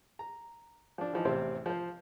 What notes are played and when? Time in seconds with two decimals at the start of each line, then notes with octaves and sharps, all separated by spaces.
0.19 A#5
0.98 F3 D4
1.13 E3 F3 D#4
1.25 A1 E2 C3 C4 C5
1.66 F3 C5